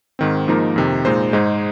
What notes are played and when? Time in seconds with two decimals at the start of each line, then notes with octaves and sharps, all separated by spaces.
0.19 G#2 D#3 C4
0.48 G#2 F3 A#3 D#4 A#4
0.76 F2 C3 D#3
1.05 A#2 G#3 D#4 C5
1.33 G#2 G#3 D#4 G#4 C5